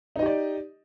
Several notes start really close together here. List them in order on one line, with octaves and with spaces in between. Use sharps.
D#4 D#5 G4 D5